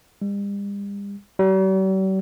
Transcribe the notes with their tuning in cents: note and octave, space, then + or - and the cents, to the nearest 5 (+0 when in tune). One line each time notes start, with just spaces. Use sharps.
G3 +45
G3 -45